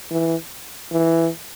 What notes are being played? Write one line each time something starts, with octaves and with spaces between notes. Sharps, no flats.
E3
E3